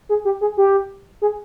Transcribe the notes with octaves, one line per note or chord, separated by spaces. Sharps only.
G#4
G4
G#4
G4
G#4